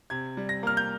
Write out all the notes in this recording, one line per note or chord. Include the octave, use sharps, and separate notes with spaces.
C3 G#6
G3
A#6
A#3 F6
G6